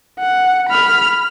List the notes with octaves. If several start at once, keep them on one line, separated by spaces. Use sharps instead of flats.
F#5
B5 F6